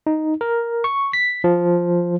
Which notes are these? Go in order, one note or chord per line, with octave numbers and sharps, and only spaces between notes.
D#4
A#4
C#6
B6
F3